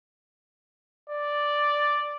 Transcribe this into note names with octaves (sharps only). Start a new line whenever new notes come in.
D5